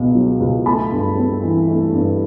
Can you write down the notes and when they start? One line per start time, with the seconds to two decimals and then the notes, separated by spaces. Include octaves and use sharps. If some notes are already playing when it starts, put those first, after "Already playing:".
Already playing: C#2 B2 B3
0.15 F#3
0.40 C#2
0.66 A3 A5 B5
0.92 G2
1.17 C4
1.43 E3
1.68 A3
1.94 G2